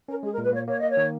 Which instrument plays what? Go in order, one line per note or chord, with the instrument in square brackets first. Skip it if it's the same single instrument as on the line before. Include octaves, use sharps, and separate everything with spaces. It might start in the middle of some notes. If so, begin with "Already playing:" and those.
[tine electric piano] C#4 [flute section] A#4
[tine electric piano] G#3 [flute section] G#4
[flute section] A#4
[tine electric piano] A#2
[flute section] B4
[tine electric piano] A#3 [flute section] C#5
[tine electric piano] A#3 [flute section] C#5
[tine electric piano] A#3 [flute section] D#5
[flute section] C#5
[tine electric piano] D#3